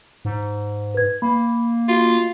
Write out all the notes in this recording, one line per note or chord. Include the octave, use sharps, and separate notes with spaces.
G#2
B4 G#6
A#3 B5
F4 F#4